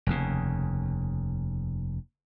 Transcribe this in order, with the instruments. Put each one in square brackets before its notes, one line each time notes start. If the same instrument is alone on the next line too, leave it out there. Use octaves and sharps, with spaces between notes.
[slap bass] F1 D#2 C#3